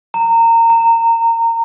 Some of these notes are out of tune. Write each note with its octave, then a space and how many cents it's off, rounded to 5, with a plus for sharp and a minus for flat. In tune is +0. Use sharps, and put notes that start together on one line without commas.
A#5 -25
A#5 -15